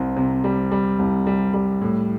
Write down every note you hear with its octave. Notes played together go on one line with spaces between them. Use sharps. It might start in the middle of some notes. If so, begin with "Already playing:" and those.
Already playing: C2 C4
C3
G3
G3
C2
G3
G3
A2